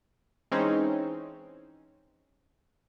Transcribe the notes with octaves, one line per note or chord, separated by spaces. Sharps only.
E3 G#3 C4 C#4 D#4